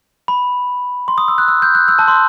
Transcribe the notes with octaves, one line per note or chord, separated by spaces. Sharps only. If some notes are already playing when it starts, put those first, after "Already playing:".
B5
C6
D#6
E6
F#6
E6
G6
F#6
E6
A5
C6